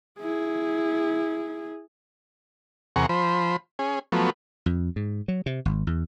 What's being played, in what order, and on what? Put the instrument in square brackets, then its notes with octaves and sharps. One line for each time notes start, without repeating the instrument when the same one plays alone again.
[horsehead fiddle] E4 G#4
[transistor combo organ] E2 C3 G#4 A#4 F#5 C#6
F3 C5 B5
C#4 G#4
F3 F#3 A3 B3
[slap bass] F2
G#2
F#3
C3
G#1
E2